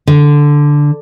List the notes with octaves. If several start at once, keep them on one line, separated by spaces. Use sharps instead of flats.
D3